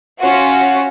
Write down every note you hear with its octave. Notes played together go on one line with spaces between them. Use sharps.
C#4 F4 F#4